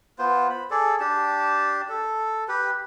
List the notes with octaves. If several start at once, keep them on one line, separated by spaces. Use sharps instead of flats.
B3 F4 C5
B5
G#4 A4 D5
D4 G4 A5
A4
G4 B4